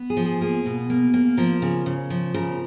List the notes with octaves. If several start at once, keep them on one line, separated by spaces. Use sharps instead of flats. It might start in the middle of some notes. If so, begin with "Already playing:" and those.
Already playing: B3
G#4
F3
G#4
A#3 G#4
B2
A#3
A#3
F3 A#4
C#3
C#3
F3
C#3 A#4